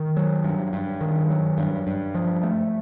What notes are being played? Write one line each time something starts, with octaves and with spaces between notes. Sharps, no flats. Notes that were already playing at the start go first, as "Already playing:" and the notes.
Already playing: D#3
F#3
G2
G2
D#3
F#3
G2
G2
F3
A3